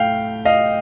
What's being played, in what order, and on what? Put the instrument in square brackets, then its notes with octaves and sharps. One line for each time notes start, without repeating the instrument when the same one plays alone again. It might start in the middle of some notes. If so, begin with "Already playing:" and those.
Already playing: [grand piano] A2 A3 F5 G5
D#5 F5